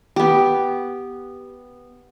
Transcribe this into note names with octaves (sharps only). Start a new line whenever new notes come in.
B3 G4